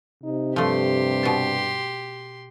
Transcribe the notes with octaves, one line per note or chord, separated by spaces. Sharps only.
C3 D#4
G2 F3 A3 G4 C6
B2 A5